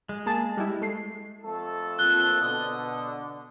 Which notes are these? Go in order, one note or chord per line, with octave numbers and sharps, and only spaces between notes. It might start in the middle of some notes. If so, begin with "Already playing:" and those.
G#3
A#3 G#4 A5
G3 E4
A3 C7
F2 A3 A4
A#3 C4 F4 F#6 G7
B2 D3 D#6